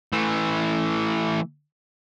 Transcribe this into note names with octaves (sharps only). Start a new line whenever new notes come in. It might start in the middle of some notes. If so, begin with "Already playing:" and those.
E3 A3